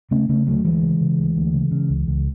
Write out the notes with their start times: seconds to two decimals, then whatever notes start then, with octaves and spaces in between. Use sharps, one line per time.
0.11 C#3 A3 C#4
0.29 C#3 A3 C#4
0.47 D2 F#3 A3
0.65 D2 E3 G#3
0.83 C#3
1.01 C#3
1.18 D2
1.36 D2
1.54 C#3
1.71 C#3
1.89 C#2
2.07 C#2